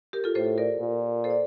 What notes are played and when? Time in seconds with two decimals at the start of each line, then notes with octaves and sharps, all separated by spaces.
0.13 G4 A#4
0.24 F4 A4
0.35 A2 A4 C5
0.58 A#4 D5
0.80 A#2
1.24 A4 C5
1.30 D5